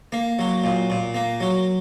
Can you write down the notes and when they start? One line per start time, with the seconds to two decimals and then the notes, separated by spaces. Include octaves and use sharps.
0.12 A#3
0.39 F#3
0.64 A#2
0.90 A#2
1.14 A#3
1.40 F#3